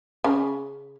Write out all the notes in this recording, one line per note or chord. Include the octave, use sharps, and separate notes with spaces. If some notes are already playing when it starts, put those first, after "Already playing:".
C#3